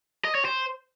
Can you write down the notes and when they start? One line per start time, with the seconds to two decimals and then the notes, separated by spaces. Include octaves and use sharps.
0.25 D#5
0.35 C#5
0.45 C5